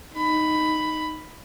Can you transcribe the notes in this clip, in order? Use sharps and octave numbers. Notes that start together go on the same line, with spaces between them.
D#4 B5